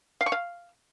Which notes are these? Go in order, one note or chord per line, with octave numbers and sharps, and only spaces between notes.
F5
C#6
F5